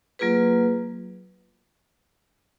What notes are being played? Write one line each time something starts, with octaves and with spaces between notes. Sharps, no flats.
F#3 A#3 F4 G#4 B4